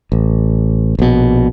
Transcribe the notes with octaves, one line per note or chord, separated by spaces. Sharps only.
A1
A#1 B2